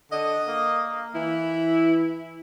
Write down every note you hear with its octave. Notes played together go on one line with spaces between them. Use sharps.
D3 D#5
A#3
E3 E4